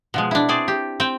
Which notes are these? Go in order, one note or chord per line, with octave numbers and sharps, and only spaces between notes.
B2 F3 G#3
D4 E4
C4 G#4 D5
G4
C4 G5